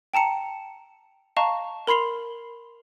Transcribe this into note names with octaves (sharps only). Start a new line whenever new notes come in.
G5 A5 A#5 C#7
D#5 F5 A5 A#5 C#6
A#4 B5 C6 C7 F7